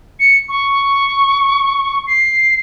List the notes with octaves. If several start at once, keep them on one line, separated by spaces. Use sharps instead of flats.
C#7
C#6
C7